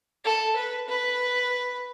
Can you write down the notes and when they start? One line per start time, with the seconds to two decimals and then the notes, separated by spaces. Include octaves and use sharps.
0.24 A4
0.56 B4
0.88 B4